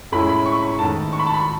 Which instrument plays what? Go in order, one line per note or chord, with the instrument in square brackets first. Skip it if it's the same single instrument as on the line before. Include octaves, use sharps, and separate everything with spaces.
[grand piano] A2 G#3 C#4 E4 B5
B5
C#6
B5
G#2 D#3 A3 A5
C#6
B5
A5
B5